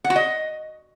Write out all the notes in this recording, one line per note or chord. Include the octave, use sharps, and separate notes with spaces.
F#5
F#4
D#5